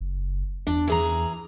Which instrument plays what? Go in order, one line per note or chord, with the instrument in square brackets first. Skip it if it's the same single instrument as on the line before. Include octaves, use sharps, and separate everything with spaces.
[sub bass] F#1
[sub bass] E2 [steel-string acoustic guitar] D4
[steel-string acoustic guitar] E3 G#4 A#5